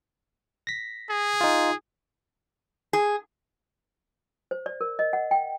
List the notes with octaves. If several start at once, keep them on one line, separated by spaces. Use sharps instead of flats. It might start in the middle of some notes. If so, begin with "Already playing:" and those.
A#6 B6
G#4
D#4 F4
G#4
C5
D5
A#4
D#5
F#5
G5